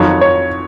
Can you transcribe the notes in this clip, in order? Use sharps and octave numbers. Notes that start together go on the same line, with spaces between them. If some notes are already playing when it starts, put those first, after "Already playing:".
Already playing: F2 D#3 F#3 C#5
C#5